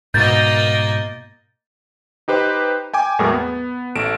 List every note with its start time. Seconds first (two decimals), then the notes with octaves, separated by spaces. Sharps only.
0.14 G#2 B2 A#3 D#5 G6 A6
2.28 D#4 G4 B4 C5
2.94 G5 G#5 D6
3.19 E2 A2 F#3 G#3 G#4 A#4
3.34 B3
3.95 A1 A3 D7 E7